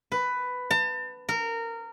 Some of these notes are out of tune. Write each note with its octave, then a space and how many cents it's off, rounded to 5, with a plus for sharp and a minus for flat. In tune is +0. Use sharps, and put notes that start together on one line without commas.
B4 +10
A5 +35
A#4 -20